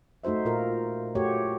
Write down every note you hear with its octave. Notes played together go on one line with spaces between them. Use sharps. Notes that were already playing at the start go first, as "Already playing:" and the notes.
A3 D#4 F#4 C5 E5
A#2 F4 A#4
A3 F#4 G4 C#5